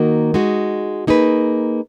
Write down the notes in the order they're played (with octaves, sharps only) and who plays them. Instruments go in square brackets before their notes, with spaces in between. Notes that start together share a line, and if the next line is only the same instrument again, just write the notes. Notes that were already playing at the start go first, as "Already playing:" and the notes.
Already playing: [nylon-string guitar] D#3 A#3 D#4 F#4 A#4
G#3 D#4 F#4
A#3 D#4 G#4 B4